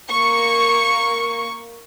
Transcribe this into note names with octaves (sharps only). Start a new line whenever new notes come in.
A#3 C#6